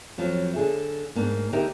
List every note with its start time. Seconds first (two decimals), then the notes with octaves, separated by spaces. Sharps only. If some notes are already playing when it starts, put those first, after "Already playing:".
0.18 F2 F3 F#3
0.54 D3 G#4 E5
1.15 G#2 A#3 D4
1.53 D3 D#4 G4 A#4 E5